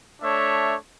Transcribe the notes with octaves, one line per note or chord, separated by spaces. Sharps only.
A3 D4 C#5 E5